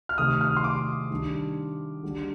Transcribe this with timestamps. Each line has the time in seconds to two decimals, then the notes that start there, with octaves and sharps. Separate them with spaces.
0.09 F6
0.18 C3 D#3 A3 D#6
0.41 F6
0.57 C6
0.64 D6
1.11 D#3 G3 D4
2.03 D3 G3 D4